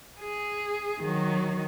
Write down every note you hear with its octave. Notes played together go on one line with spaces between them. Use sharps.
G#4
D#3 F#3